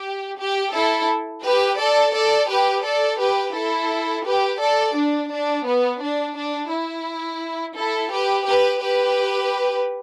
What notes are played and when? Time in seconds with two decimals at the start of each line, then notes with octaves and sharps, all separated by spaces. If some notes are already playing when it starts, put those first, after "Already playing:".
Already playing: G4
0.39 G4
0.73 E4 A4
1.44 G4 B4
1.79 A4 D5
2.14 A4 D5
2.49 G4 B4
2.84 A4 D5
3.19 G4 B4
3.54 E4 A4
4.24 G4 B4
4.60 A4 D5
4.95 D4
5.30 D4
5.65 B3
6.01 D4
6.35 D4
6.70 E4
7.76 E4 A4
8.11 G4 B4
8.45 G4 B4
8.80 G4 B4